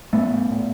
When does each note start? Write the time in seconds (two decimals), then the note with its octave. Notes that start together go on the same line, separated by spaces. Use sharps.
0.13 A2 A3 B3
0.51 A2